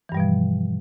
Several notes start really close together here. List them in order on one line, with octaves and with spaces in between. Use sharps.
E3 G2 G3 B2 F3